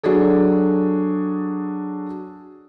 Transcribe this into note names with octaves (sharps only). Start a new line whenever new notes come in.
F#3 D4 F#4 G#4 A4